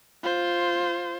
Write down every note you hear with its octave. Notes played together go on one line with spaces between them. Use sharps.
F4 C5